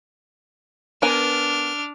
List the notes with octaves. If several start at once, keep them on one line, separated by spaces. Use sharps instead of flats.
B3 D4 A#4 G#5 F6